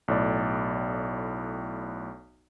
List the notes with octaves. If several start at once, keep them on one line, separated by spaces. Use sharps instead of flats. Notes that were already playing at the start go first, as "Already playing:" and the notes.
B1 A2 D5